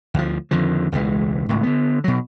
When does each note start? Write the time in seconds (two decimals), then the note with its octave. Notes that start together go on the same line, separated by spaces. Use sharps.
0.14 D2 F3
0.51 F2 D3 D#3 F3
0.92 E1 C#2 E3 G#3
1.49 D1 G#1 C#2 A2
1.63 D3 B3
2.04 B2 F#3